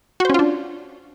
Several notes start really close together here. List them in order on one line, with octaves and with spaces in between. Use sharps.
F#4 C5 C#4 F4 D4